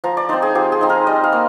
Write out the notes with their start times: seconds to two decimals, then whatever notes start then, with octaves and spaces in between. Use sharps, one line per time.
0.04 F3 A#5
0.17 D5
0.29 C4 D#4 C5
0.42 G#4
0.55 F3 G4
0.72 G#4
0.81 C4 D#4
0.90 A#4
1.07 G3 D#5
1.24 F5
1.32 A#3